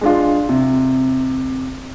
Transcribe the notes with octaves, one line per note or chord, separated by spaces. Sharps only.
G#3 D4 F4
C3